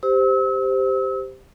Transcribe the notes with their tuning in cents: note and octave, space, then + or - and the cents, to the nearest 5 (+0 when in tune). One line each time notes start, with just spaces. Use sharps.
G4 +0 C5 -10 E6 -35